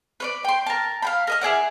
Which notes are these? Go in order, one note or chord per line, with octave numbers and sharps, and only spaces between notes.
B4 C#5 D5
G5 C6
A#4 A5
F5 G5 B5
A#4 D#5 D#6
E4 G#4 D5 F#5